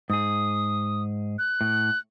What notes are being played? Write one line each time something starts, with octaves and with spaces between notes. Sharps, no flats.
G#2 G#4 D#6
F#6
A2